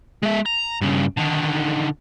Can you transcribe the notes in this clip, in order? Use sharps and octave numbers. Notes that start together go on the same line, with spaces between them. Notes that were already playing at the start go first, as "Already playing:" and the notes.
G#3 E5
A#5
G2 C#3
D3 D#3